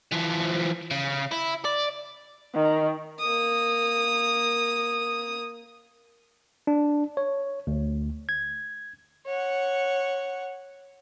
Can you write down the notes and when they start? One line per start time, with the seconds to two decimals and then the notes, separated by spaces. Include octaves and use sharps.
0.12 E3 F3
0.91 C#3
1.32 E4
1.65 D5
2.55 D#3
3.20 A#3 D#6
6.67 D4
7.17 C#5
7.67 D2
8.29 G#6
9.26 C#5 F#5